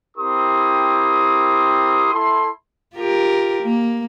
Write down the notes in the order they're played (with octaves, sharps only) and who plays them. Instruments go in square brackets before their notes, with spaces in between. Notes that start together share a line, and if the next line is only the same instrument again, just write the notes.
[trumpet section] C4 E4 G4 A#4 C6 D#6
E4 A4 C6
[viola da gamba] F4 G4 A#4
A#3